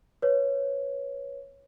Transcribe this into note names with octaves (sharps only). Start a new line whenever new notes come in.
B4 C#5